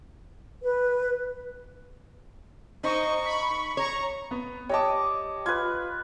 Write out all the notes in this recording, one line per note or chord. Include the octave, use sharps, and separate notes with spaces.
B4
D#4 C5 D#5 C#6
B5
C#5 A#5 C#6
B3
G3 C#5 D#5 A5 D6
F4 B4 G#6